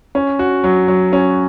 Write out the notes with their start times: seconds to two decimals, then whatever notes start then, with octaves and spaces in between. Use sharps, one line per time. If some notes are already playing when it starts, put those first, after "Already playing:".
0.15 C#4
0.39 F#4
0.64 F#3
0.88 F#3
1.13 C#4